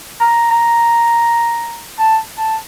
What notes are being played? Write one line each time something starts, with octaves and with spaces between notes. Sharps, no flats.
A#5
A#5
A5
A5